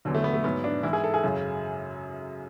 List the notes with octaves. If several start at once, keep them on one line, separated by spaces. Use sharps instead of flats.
E2 D3 F#3
A3
B3
A3
G#2 F#3 B3
D4
G#2 E3 E4
G#4
A4
G#4
F#2 C#3 F#3